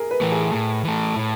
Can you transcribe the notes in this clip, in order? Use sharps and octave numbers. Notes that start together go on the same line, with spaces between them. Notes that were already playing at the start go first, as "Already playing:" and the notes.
Already playing: G#4 A#4
B4
E3 A3
G#4
A2
E3 A3
A2